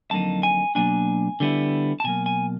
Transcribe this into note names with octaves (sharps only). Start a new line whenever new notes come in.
F2 D3 F#3 A#3 D#4 A5
G#5
B2 F#3 A#3 D4 G#5
D3 G3 B3 E4
A5
B2 F#3 A#3 G#5
G#5